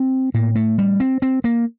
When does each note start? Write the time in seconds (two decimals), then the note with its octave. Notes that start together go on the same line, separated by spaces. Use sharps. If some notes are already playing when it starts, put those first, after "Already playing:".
Already playing: C4
0.34 A2 A#3
0.55 A3
0.78 G3
1.00 C4
1.22 C4
1.44 A#3